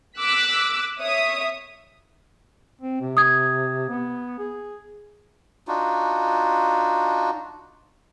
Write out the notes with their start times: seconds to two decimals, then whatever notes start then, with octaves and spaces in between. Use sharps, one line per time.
0.19 D6 E6 F#6 B6
1.00 C#5 E5 D#6
2.81 C4
3.01 C3
3.17 D#6 G#6
3.89 B3
4.39 G#4
5.68 D4 D#4 F4 F#4